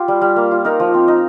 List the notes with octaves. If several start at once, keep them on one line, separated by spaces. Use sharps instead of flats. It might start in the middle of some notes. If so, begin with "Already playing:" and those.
Already playing: F4 G4
G3
G3
A#3
F4
D#4 A#4
F3
C4
D#4